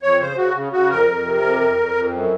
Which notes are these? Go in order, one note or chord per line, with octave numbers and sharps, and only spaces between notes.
F2 C#5
C#3 C5
C#3 F#4
C#3
C#3 F#4
F2 A#4
F2
C3
F2
F2
F2
F2
F#2